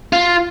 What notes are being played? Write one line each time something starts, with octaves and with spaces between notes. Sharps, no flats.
F4